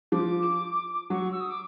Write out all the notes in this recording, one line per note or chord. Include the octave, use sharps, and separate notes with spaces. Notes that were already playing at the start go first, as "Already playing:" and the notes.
F3 D6
F#3 C#6
E6
D#6
D6